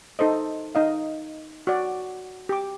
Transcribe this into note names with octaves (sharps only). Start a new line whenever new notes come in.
D#4 A4 C5 D#5
D#4 D#5 F5
F#4 D5
G4 D6